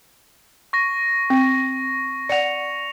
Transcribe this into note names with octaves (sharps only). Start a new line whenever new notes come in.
C#6 A#6
C4
D5 F#5 C#7 F7